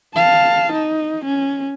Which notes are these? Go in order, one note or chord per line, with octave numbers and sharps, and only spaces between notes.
F5 A5
D#4
C#4